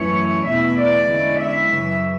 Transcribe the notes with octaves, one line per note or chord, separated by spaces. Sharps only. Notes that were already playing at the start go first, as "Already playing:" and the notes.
Already playing: F#2 E3 A3 C#4 E4 C#5
E2 B2 A3 E4 E5
D5
D3 G#3 C#4 E4
E5
F#2 C#3 E3